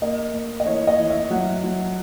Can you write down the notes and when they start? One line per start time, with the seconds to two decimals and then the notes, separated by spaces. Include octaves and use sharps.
0.02 A#3 D#5
0.34 A#3
0.60 D#5
0.66 E3 C#5
0.87 D#5
0.99 E3
1.10 E5
1.31 F#3 F#5
1.64 F#3